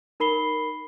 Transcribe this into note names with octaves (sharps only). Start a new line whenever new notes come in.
D#4 A#4 B5 C7 G7